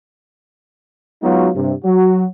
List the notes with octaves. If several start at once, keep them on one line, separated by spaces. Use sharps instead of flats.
F#3 G#3 B3 D#4 F4 F#4
G2 C3
F#3 F#4